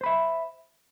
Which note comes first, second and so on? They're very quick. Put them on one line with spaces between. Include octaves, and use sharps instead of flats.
C5 B5 E5